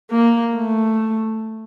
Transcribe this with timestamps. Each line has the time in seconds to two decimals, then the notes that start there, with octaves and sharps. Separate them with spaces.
0.11 A#3
0.55 A3